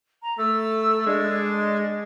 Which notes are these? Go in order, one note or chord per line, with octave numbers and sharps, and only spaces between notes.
A#5
A3 E6
G#3 D4